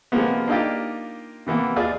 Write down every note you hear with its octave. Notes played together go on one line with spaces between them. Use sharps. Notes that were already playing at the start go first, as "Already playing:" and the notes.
C3 F3 G#3 A#3 B3
A#3 D4 D#4 F4 G4
C3 E3 A#3 B3
D#2 F4 G#4 D5